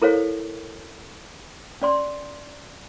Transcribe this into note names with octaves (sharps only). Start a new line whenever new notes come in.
E4 A4 A#4 C5 C#5 F5
C#4 D5 C6